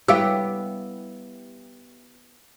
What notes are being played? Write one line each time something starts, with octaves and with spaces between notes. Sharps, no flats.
G3 B3 E4 G4 C#5 F5 E6